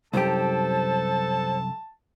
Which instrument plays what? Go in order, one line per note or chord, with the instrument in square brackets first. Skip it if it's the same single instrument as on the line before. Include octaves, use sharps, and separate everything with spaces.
[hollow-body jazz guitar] C2 F#2 G4 [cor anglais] A4 [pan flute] C5 [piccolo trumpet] A5